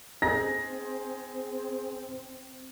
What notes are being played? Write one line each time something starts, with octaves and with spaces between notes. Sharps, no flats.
C4 D#4 G#4 A#5 A#6